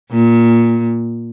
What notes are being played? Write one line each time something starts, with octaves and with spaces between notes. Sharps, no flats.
A#2